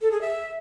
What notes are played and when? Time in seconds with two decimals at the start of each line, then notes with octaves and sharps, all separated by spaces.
0.02 A4
0.11 G#4
0.21 E5